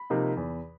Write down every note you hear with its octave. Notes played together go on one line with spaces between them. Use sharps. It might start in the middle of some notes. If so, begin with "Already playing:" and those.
Already playing: B5
C3 F3 A#3 D#4
E2